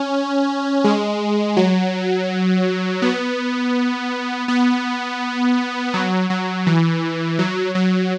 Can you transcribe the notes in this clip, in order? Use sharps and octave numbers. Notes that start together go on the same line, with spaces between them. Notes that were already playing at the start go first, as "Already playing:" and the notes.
Already playing: C#4
G#3
F#3
B3
B3
F#3
F#3
E3
F#3
F#3